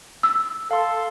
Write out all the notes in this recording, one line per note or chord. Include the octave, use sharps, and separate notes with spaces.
E6
A4 F5 C6